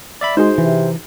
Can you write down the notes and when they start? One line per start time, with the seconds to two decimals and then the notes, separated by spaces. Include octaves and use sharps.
0.21 D5 E5 B5
0.37 G#3 D#4 F#4 G#4 C5
0.58 C3 E3